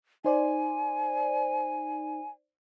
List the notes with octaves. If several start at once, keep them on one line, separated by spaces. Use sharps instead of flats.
D#4 C5 D5 G#5